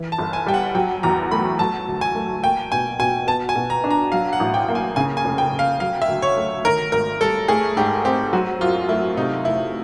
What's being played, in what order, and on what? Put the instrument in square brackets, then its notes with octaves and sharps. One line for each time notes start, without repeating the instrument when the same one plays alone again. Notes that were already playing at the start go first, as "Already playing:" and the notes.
Already playing: [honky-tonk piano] E3
[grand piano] A5
[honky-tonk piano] G1
[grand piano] G#5
[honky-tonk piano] G3 [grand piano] G5
[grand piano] F#5
[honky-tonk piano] F#3 [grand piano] G5
[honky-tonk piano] E2 [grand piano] A#5
[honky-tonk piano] A3 [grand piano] B5
[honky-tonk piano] F#3 [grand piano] A5
[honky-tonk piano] D2
[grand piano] G#5
[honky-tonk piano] A3
[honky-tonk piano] A#3 [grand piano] G5
[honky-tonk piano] B2 [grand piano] G#5
[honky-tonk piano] B2 [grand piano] G#5
[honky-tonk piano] B3 [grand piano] A5
[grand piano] G#5
[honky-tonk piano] B2
[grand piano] A#5
[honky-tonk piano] D4
[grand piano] A#5
[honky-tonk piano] F#3 [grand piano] F5
[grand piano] F#5
[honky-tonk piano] A1
[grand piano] G5
[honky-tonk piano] A#3
[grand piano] G#5
[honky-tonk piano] C#3 [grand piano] G#5
[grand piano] G#5
[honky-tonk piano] F1
[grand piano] G5
[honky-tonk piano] F1
[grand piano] F5
[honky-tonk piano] F#3 [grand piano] F5
[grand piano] E5
[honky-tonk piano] D2
[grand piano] C#5
[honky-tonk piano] A3
[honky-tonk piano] D#3 [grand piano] A#4
[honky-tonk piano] G#1 [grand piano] A#4
[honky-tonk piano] G3 [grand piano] A4
[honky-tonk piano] A3 [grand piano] G#4
[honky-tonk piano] G#2 [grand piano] G4
[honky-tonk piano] C4 [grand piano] G4
[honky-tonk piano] F#3 [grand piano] F#4
[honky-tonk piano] F#2 [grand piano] F4
[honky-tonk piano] A3 [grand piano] E4
[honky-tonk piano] C3 [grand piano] D#4
[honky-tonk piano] F1 [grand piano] E4